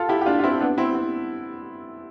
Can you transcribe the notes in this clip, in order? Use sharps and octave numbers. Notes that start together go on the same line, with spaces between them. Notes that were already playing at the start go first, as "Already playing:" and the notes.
Already playing: F4 A4
E4 G4
G4
D4 F4
F4
C4 E4
B3 D4
C4 E4
C4